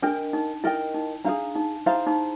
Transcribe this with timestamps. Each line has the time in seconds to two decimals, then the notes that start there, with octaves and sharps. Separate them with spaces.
0.02 D4 A#4 D#5 G5
0.33 D#4
0.64 E4 A#4 D#5 G5
0.94 D#4
1.24 D4 G#4 C5 F5 A#5
1.56 D#4
1.86 E4 G#4 C5 F5 A#5
2.07 D#4